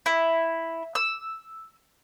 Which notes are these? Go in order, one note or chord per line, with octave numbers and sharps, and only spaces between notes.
E4
E6